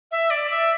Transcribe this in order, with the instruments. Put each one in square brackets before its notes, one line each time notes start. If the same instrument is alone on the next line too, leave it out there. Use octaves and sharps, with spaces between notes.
[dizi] E5
D5
E5